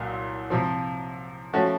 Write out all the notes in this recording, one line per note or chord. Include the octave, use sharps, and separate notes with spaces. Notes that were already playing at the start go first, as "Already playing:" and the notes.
Already playing: C2 A#2 F#3
C3 F3 C4
F3 A3 C#4 F#4